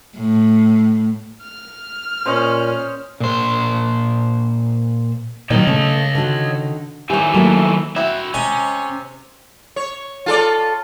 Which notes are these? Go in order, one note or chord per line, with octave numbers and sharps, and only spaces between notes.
A2
F6
A#2 C#4 C5 D#5 C6
A#2 C5
A#2 D#3 F#3 C#5 D#5
C#3 A3
D3 D#3 F#4
D#3 E3 G4 C#5 G#5
F#3 A3 A#3
C4 E4 F#4 E5
C3 G#3 C#4 G#5
C#5
F4 A4 D5